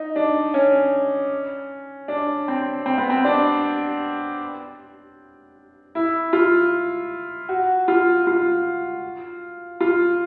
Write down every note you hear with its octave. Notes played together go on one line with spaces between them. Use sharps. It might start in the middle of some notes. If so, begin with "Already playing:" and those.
Already playing: D#4
D4
C#4
D4
C4
C4
B3
C4
D4
E4
F4
F#4
F4
F4
F4